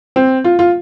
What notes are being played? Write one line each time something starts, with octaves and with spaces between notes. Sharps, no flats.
C4
F4
F4